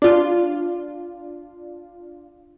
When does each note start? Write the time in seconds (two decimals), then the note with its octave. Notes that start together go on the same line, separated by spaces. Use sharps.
0.02 D4 F4